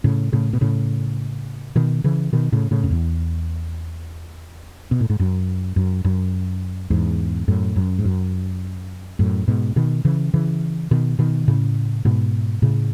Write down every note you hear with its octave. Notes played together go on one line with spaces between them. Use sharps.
A2 C#3
A2 C#3
B2
A2 C#3
B2 D#3
C#3 E3
B2 D#3
A2 C#3
A2 C#3
F#2
E2
B2
A2
G#2
F#2
F#2
F#2
E2 G#2
F#2 A2
F#2
G#2
F#2
F#2 A2
G#2 B2
B2 D#3
C#3 E3
C#3 E3
B2 D#3
B2 D#3
A2 C#3
G#2 B2
A2 C#3